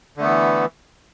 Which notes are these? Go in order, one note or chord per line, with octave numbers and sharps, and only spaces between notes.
D3 E3 A3 B3